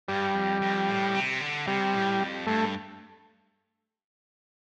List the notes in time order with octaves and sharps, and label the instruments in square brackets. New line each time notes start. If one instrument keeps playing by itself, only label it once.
[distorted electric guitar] G2 [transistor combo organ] G3
[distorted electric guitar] F2
F2
A2
C3
D3
[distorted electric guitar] C3 [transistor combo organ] G3
[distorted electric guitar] A2
F2
[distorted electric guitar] G2 [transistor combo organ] A3